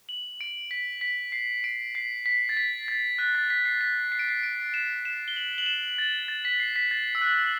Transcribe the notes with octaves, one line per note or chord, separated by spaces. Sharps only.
F#7
D7
B6
B6
C7
D7
C7
B6
A6
B6
A6
F#6
A6
B6
C7
B6
C7
D7
C7
D7
E7
E7
G7
F#7
F#7
E7
A6
A6
B6
C7
B6
A6
E6
F#6